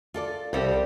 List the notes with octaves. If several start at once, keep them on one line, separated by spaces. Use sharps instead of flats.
F4 A4 D5
C2 F3 G3 C4